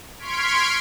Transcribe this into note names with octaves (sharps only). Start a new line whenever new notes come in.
C6 C#6 F6 G#6 B6 D7